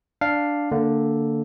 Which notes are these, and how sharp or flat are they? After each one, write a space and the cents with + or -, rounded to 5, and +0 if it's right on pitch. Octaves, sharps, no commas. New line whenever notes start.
D4 +0 F5 +0
D3 +0 A#3 -20